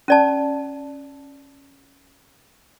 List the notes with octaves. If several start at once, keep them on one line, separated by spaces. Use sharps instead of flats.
C#4 D5 A5